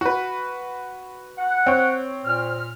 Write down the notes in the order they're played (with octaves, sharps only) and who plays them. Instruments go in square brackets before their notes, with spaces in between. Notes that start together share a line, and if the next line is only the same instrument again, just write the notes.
[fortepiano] F#4 B4
[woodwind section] F#5
[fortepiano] C4 C#5
[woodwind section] A#2 F6